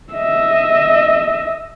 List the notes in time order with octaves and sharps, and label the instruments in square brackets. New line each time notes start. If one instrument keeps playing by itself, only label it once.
[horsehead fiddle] D#5 E5